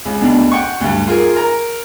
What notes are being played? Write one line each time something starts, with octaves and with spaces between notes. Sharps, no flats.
C#2
D2 B2 D4
F#5 G5 C#6
D2 G2
F4 G#4 A#4
A#4 A#5